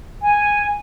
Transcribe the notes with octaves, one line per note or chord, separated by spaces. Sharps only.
G#5